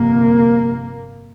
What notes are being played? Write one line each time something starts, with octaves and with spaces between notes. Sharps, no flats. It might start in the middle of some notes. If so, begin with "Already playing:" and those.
Already playing: G1 F2 C3 A#3